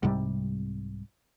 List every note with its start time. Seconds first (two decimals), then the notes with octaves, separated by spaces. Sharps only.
0.03 C2 G#2 C3 G3